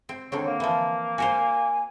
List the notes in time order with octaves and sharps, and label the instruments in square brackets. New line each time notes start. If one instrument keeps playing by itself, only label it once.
[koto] C4
[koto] D3 D#3 C4 [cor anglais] C#5
[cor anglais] A#3
[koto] E3 F3
[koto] F#4 A#4 C5 [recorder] G#5